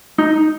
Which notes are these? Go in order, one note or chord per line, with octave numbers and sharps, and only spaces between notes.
D#4